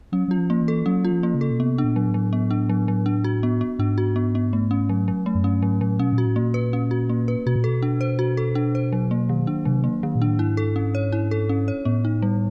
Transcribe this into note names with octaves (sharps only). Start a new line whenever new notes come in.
F#3 C#4
F#3 F4
F3
A#3
E3
A4
F#3 C#4
F4
F3
A#3
C#3
A4
B2
C3 B3
D4
A#2
F#3
A2
F#3
B3
D4
F#3
F#3
D4
F#4
B3
B3
G#2 D4
F#4
B3
B3
A3
C#4
F#3
F#3
A3
F#2
G2 C#4
G#2 F#3
A2 F#3
B2 C#4
A#2
F#4
A2
A#2 A#3
B4
C#4
F#4
A#3
B4
B2 F#4
A#2
B2 A4
D4
C5
F#4
A4
D4
C5
F#3
A#3
D#3
D4
C3 F#3
A#3
D#3
A#2
D4
A2
G#2 E4
A4
C#4
C#5
E4
A4
C#4
C#5
A2 B3
D#4
G3